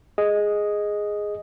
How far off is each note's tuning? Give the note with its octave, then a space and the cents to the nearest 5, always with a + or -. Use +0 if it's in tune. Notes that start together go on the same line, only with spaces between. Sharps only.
G#4 +0 D#5 +0